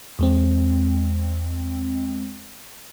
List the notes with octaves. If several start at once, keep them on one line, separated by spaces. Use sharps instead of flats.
E2 G#3 C4